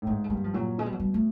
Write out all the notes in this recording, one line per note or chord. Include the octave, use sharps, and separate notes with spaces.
A2
G#2 B3
A3
G2 A#3
F3
A#2 F#3
B2 G#3
G3
F#3
G3
A3